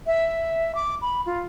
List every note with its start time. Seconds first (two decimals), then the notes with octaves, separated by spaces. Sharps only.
0.07 E5
0.75 D6
1.02 B5
1.26 F4